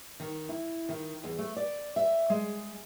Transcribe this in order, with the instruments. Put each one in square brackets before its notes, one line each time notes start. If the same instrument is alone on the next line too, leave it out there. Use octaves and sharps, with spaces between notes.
[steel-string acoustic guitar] D#3
E4
D#3
E2
A3
D5
E5
G#3